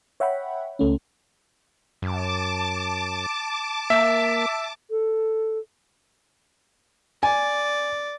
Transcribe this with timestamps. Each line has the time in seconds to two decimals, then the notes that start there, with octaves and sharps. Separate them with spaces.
0.20 C#5 E5 F#5 G5 B5
0.79 C#2 A3 C#4
2.02 F#2 A5 D6
3.90 A#3 E5
4.91 A4
7.23 D5 G#5